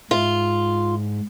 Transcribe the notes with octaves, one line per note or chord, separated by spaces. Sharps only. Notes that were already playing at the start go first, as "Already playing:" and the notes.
G#2 F4